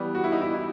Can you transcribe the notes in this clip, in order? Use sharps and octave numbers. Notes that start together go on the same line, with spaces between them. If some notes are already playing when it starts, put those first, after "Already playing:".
Already playing: E3 G3 B3
F#4
E4
D#4
E4
E4